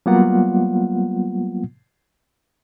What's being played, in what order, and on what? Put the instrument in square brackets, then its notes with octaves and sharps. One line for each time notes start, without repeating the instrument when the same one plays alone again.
[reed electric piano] F#3 G3 A#3 B3 F4 F#5